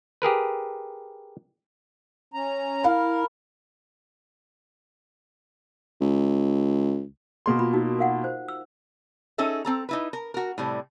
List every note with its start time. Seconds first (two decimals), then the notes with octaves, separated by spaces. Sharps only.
0.22 G4 G#4 A#4 B4
2.34 C#4 A#5
2.84 E4 A#4 F5
6.01 C#2
7.46 B2 A#3 C6
7.59 F4 B5
7.73 D#4 F#4 A#4
7.99 A#4 F5 F#5
8.24 C5
8.48 E6
9.38 C#4 D#4 G#4 A4 E5
9.65 C4 A4 A#5
9.89 D#4 E4 B4
10.13 A#4
10.34 F#4 A#4
10.58 A2 C3 G3